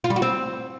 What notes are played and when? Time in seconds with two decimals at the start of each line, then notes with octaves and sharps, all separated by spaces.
0.04 F4
0.10 G3
0.16 F#4
0.22 C4